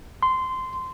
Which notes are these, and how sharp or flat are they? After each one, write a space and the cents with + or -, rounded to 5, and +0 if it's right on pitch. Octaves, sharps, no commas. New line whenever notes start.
C6 -15